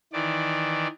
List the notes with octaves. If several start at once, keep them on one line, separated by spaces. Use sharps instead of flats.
D#3 E3 D5